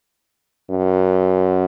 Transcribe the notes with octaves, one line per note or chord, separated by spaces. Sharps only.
F#2